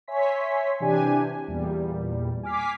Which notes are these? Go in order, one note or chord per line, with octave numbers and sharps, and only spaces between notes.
C#5 E5 G#5 C6 B6
C3 E3 D4 G4 G#5
E2 A#2 G3
G#5 D6 F6 B6 C7